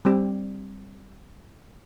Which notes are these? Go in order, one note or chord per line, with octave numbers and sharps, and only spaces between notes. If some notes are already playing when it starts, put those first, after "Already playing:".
G3 C4 G4